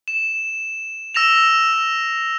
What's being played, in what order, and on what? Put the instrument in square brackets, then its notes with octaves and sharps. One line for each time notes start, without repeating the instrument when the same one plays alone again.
[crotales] E7
E6 A#6 E7 F7